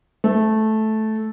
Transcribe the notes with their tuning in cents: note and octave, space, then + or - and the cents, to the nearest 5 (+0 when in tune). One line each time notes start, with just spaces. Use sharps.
A3 -10